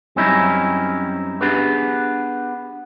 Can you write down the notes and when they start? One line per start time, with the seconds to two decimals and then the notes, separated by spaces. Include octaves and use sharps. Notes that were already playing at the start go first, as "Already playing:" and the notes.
0.16 F#2 G3 C4 C#4 D#4 E4
1.41 B3 D4 G4 G#4 B4